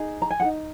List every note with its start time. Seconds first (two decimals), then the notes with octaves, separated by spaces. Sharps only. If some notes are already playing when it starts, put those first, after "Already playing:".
Already playing: D#4 G#4
0.22 A#5
0.30 G#5
0.40 G#4 F#5
0.44 D#4